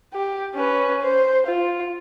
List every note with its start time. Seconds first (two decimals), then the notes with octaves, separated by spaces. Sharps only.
0.14 G4
0.55 C#4 B4
1.01 C5
1.47 F4